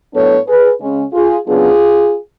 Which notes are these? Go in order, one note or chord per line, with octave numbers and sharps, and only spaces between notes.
A2 F#3 B3 D4 A4 C#5
G#4 B4
C#3 G#3 C#4
F4 G#4
C#3 F#3 B3 D4 F4 G#4